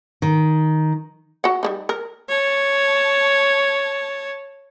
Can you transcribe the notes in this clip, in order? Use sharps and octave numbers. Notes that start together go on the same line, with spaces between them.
D#3
F#4 F#5
G3 A#3 D#4
A#4
C#5 A5